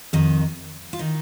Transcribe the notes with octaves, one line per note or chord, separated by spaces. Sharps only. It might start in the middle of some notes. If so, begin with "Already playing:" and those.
F2 D#3 D#4
F4
D#3 D#4